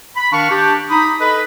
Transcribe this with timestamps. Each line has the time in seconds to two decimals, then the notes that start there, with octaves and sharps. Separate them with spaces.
0.16 B5
0.33 D#3 D4 F5 C#6
0.50 D4 G4
0.90 D#4 B5 D#6
1.20 A4 B4 D#5 B5